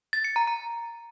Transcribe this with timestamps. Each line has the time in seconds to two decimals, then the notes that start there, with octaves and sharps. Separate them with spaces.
0.13 A6
0.24 C#7
0.36 A#5
0.47 A#5